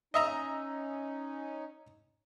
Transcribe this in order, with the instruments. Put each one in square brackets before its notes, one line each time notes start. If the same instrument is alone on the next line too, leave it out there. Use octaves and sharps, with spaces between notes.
[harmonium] C#4 D#4 [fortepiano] D#5 E5 A#5